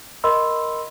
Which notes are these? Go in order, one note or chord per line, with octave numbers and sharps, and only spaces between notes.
A#4 D#5 B5 C6 E6